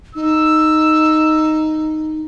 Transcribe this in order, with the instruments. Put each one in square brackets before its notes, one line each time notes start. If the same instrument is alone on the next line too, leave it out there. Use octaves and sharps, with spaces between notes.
[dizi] D#4 [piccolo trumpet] E6